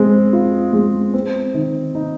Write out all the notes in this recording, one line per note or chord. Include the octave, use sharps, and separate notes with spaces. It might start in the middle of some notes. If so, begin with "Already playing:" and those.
Already playing: G#3 C4
F4
G#3
C4
D#3
D#4